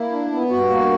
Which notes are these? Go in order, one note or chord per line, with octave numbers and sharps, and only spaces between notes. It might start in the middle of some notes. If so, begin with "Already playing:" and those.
Already playing: A#3 E4
D4
B3
G2 F#4
A#3